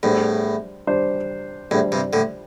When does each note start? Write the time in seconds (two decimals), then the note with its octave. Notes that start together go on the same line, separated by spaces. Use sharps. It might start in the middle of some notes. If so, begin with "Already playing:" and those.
0.03 E2 A2 G3 D4 C5
0.87 G3 D4 C5
1.71 E2 A2 G3 D4 C5
1.92 G2 C3
2.13 A2 D3